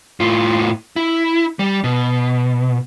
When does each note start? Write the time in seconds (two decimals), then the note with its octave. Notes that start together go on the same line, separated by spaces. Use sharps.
0.20 A2 F4
0.96 E4
1.59 G3
1.84 B2